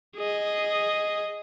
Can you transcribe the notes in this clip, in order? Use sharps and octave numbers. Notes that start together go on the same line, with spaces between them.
G#4 D#5